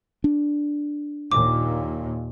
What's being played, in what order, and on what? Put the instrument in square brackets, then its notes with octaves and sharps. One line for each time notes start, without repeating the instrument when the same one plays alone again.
[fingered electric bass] D4
[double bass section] D#2 A#2 [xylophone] D6